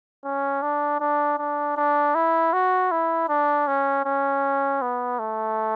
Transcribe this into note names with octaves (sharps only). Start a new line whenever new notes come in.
C#4
D4
D4
D4
D4
E4
F#4
E4
D4
C#4
C#4
B3
A3